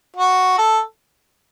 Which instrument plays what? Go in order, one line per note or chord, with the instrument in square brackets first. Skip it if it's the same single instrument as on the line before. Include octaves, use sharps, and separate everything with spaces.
[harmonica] F#4
A4